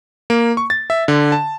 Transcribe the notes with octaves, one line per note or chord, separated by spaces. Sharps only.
A#3
C#6
A6
E5
D3
A5